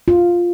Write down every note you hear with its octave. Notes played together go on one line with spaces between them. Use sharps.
F4